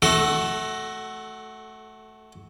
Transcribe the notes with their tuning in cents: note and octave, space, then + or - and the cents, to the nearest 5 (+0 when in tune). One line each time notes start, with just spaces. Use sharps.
A3 -20 F#4 +15 A4 +0